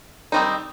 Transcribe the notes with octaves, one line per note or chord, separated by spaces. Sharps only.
D#3 G3 C4 D#4